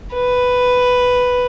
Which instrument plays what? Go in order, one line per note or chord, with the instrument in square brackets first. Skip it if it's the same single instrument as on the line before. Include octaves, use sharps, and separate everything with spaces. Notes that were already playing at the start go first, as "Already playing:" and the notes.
[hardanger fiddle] B4